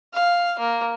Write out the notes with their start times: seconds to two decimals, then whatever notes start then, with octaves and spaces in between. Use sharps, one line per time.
0.14 F5
0.59 A#3